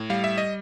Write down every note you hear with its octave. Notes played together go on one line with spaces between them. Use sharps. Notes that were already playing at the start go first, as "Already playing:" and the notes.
Already playing: A2
G3 F5
E5
D#5